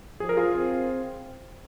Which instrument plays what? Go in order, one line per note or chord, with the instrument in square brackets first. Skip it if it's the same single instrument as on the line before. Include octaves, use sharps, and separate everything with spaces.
[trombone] F3 [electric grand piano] G#4
[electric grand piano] A#4
F4 G#4
[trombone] C4